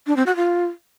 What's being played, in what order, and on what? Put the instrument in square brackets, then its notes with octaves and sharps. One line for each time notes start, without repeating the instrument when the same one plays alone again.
[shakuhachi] D4
C4
F#4
F4